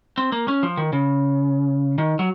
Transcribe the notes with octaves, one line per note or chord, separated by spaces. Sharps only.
C4
A#3
C#4
F3
D#3
C#3
D#3
F#3